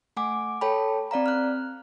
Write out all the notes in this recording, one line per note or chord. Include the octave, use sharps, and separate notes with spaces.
A3 F#5 G#5 D6
A4 C#5 G5 A5 B5
C4 D5 F5 A#5
F6 F#6